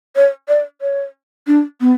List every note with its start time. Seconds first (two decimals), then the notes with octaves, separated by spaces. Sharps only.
0.16 C#5
0.48 D5
0.81 C#5
1.47 D4
1.80 B3